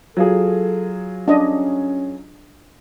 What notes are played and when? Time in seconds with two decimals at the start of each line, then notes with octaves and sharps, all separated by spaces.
0.17 F#3 F4 G#4 A4
1.28 C#4 D4 D#5